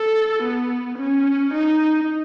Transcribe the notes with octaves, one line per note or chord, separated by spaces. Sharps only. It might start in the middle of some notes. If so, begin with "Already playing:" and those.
Already playing: A4
B3
C#4
D#4